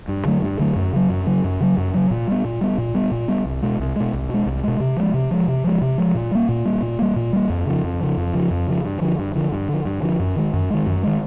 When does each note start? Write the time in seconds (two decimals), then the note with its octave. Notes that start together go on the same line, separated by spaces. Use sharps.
0.08 G2
0.25 D3 F#3 A3
0.42 G2
0.59 D3 F#3 A3
0.76 F#2
0.93 C#3 F#3
1.10 F#2
1.26 C#3 F#3
1.44 F#2
1.60 C#3 F#3
1.77 F#2
1.94 C#3 F#3
2.11 A#2
2.28 G3 B3
2.44 A#2
2.61 G3 B3
2.78 A#2
2.95 G3 B3
3.11 A#2
3.28 G3 B3
3.45 C2
3.62 B2 G#3
3.79 C2
3.96 B2 G#3
4.13 C2
4.29 B2 G#3
4.46 C2
4.63 B2 G#3
4.80 C3
4.97 F3 G#3
5.14 C3
5.31 F3 G#3
5.48 C3
5.64 F3 G#3
5.81 C3
5.98 F3 G#3
6.15 A#2
6.31 G3 A#3
6.49 A#2
6.65 G3 A#3
6.82 A#2
6.99 G3 A#3
7.16 A#2
7.33 G3 A#3
7.50 F2
7.66 C#3 F3
7.84 F2
8.00 C#3 F3
8.17 F2
8.34 C#3 F3
8.51 F2
8.68 C#3 F3
8.84 G2
9.01 D3 F3
9.19 G2
9.35 D3 F3
9.52 G2
9.68 D3 F3
9.85 G2
10.02 D3 F3
10.19 F#2
10.36 D#3 G#3
10.53 F#2
10.70 D#3 G#3
10.86 F#2
11.03 D#3 G#3